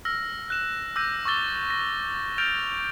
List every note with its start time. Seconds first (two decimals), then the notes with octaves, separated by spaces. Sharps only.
0.05 E6 F6 A#6
0.48 F6 F#6 E7
0.96 D6 E6 F#6 G6 A#6 D#7
1.25 C#6 D6 E6 A6 G7
1.70 A#6
2.38 F6 G6 A6 D7 F7